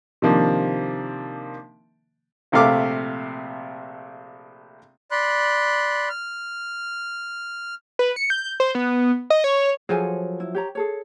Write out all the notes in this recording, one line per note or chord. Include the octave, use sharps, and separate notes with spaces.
C3 D#3 F3 A#3 D4
A#1 C3 A3 F5 D6
D5 B5 C6 F#6
F6
B4
C#7
G6
C5
B3
D#5
C#5
F3 F#3 G#4 A4 G#5
E4
G4 C#5 A#5
G#4 A4 C#5